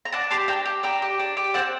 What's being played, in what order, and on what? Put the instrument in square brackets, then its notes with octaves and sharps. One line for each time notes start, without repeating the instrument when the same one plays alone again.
[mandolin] A#5
D4 F#5 A5
G4 A5 C6
D4 G5 A#5
G4
D4 G5 A#5
G4
D4
G4
C4 F#5 A5